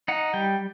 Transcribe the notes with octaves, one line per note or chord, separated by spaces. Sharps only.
D#4 F#5
G3 G5